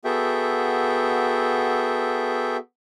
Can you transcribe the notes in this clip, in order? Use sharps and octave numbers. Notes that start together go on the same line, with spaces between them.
B3 F#4 G#4 A4 E5 G5